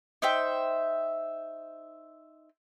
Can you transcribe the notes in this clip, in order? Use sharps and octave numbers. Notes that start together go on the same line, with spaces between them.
D#4 C5 E5 G5